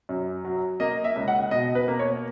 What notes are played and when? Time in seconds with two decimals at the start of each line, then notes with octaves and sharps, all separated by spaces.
0.09 F#2
0.45 F#3
0.80 A#3 D#5
1.04 E5
1.16 C#2
1.28 F#5
1.51 B2 D#5
1.75 B4
1.88 A#3
1.99 C#5